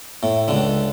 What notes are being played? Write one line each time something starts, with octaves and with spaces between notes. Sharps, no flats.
A2
C#2 D3